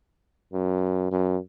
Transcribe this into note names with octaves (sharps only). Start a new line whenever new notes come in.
F#2
F#2